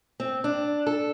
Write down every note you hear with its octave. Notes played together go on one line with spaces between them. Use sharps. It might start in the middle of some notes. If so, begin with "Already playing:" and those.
C4
D4
A4